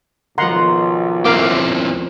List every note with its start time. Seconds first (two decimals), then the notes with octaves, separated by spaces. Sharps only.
0.38 B1 D#3 F3 F#5 A#5 C6
1.25 C4 C#4 E4 A#4 F5 D6